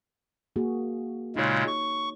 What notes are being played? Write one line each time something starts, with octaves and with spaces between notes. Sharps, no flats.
A#3 F#4 G#4
A#2 C#3 G#3 D#4 C#5
C#6